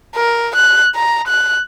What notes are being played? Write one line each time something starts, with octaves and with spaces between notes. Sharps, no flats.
A#4
F#6
A#5
F#6